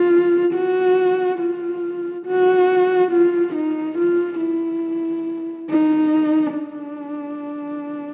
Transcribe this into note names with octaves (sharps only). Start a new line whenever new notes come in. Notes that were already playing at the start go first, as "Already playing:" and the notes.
Already playing: F4
F#4
F4
F#4
F4
D#4
F4
E4
D#4
D4